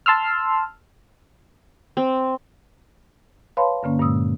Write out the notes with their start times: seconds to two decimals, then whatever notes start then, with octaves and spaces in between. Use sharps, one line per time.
0.06 A5 C6 E6 F6
1.97 C4
3.57 B4 C#5 F5 A5 B5 C6
3.83 G2 D3 A#3 C#4
4.00 G2 A#2 G#3 D#6 E6